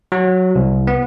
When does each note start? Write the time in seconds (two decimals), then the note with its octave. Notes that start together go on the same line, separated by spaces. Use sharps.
0.12 F#3
0.55 C2
0.87 B3